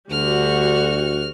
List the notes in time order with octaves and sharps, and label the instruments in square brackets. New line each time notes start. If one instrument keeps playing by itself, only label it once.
[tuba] D2 [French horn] D3 [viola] G3 F#4 [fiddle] F6